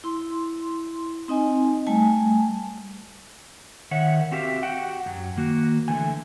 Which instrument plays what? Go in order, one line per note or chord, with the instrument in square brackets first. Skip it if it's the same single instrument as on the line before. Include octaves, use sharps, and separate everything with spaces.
[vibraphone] E4 C6
C4 D#4 D#5 G#5
G3 A3 G#5 A5
[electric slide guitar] D#3 C#5 E5 F#5
C4 F#4 G4 E5 F5
F#4 G4 F#5 G5
F#2 F#3
D#3 A#3 F#4
D3 E3 A3 G#5